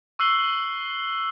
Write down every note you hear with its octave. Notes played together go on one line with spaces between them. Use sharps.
C#6 E6 F#6 C7 F#7 G7